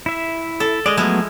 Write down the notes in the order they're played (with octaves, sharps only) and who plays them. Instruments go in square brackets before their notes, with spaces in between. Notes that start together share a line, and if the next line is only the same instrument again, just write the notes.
[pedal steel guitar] E4 E5
[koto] A4
[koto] G#3 [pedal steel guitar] D5 D#5
[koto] F3 G#3 E4 [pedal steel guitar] F#3 A3 B3